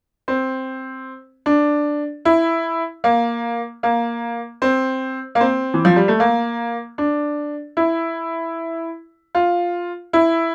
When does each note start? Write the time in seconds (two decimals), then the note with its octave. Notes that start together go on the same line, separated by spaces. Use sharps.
0.28 C4
1.46 D4
2.25 E4
3.04 A#3
3.83 A#3
4.62 C4
5.35 A#3
5.40 C4
5.74 E3
5.85 F3
5.96 G3
6.08 A3
6.20 A#3
6.98 D4
7.77 E4
9.35 F4
10.13 E4